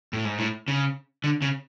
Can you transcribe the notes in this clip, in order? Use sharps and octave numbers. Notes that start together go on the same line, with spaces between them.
A2
G#2
A2
C#3
D3
C#3